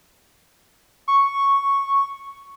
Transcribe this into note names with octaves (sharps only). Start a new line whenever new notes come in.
C#6